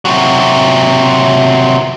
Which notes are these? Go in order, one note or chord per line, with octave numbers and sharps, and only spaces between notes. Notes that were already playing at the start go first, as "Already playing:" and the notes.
C3 F#3